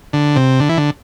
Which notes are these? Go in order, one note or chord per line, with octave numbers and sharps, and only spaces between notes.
D3
C3
D3
E3
D3